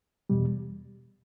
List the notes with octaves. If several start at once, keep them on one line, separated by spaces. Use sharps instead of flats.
E2 B2 G3